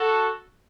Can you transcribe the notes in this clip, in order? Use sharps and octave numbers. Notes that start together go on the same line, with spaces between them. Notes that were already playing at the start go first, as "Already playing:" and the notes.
Already playing: F#4 A4